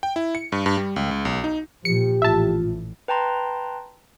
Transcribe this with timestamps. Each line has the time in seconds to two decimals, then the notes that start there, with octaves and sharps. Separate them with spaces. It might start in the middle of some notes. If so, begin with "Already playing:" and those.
0.03 G5
0.16 E4
0.35 C#7
0.52 G2
0.66 G2
0.77 G3
0.96 C#2
1.11 C#2
1.25 B1
1.44 D#4
1.85 A#2 F3 G4 C#7
2.22 A1 A2 F4 E5 A5
3.08 B4 G5 A5 A#5 C6